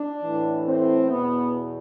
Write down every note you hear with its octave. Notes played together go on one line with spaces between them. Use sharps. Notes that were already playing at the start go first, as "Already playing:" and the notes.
Already playing: D4
A2 E3
C4
E2 B2 B3